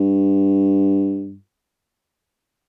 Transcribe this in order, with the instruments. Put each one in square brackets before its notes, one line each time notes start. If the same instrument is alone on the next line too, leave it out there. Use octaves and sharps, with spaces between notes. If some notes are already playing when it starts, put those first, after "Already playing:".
Already playing: [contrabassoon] G2